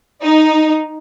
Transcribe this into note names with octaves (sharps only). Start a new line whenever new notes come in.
D#4